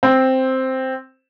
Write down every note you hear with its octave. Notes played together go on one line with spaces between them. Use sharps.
C4